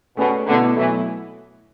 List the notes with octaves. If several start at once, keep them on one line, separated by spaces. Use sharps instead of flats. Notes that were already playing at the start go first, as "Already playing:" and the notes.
B2 A3 C#4 G#4 B4 D5
B2 D3 A3 E4 B4
B2 E3 F#3 A3 E4